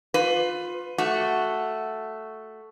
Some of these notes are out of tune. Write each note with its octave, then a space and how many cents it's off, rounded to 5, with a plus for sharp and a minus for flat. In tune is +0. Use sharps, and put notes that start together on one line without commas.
F4 +20 B4 +25
A3 +0 F#4 +0